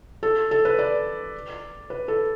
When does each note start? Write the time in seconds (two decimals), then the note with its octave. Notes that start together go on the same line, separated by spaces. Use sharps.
0.23 A4
0.51 A4
0.65 B4
0.79 D5
1.90 B4
2.08 A4